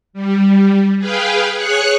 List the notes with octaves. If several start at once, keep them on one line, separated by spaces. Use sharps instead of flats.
G3
G#4 B4 F5 G5
G#4 C#5 C#6 F#6